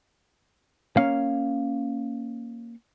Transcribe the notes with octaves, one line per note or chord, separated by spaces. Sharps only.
A#3 C#4 F5